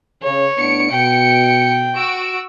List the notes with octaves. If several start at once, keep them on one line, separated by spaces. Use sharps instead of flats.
C#3 C#5
A2 B3 D4 C#7 D7
B2 G5
F#4 E6 D7